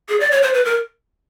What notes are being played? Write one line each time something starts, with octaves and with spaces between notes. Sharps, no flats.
G#4
D5
C#5
C5
B4
A#4